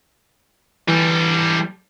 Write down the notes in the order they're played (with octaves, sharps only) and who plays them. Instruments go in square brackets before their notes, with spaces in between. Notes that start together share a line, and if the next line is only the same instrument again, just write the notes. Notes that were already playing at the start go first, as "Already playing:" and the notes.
[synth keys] E3 [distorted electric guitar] G3 A4